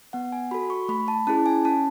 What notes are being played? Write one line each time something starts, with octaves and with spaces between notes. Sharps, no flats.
B3 F#5
G#5
F#4 A4 B5
C#6
A3 B5
A5
C#4 E4 G#4 A5
G#5
C#4 A5